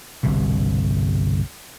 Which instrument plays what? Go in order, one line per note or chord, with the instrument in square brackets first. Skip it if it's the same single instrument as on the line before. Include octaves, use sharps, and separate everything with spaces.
[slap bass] G1 C2 G2 B2